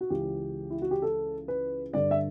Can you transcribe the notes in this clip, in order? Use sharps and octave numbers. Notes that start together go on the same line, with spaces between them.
F#4
C#2 C#3 E3 G4
E4
F#4
G4
A4
B4
G2 D3 D5
E5